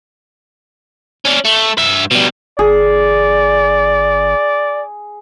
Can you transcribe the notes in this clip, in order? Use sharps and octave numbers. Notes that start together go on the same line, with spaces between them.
C#4 D4
A3
G2 E5
B2 G3
G1 G#4 D5